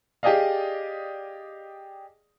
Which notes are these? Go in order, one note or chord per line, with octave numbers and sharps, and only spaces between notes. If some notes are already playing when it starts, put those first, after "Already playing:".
G4 G#4 D5 D#5 F5